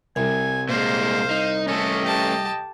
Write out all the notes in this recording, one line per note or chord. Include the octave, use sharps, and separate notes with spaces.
C2 G#5
A#2 G#3 C5 F5
D#4
A3 C#4 A4 D#5
G4 A5